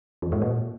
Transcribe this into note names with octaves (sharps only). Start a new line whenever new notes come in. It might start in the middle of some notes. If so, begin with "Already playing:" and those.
E2
G#2
A#2